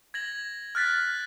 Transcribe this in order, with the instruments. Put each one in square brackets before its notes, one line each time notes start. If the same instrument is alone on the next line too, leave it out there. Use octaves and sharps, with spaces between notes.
[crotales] G#6 A#6 F#7
F6 F#6 A6 B6